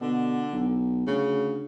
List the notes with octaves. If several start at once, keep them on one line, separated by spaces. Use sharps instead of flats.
B2 D3
B1
D2 C#3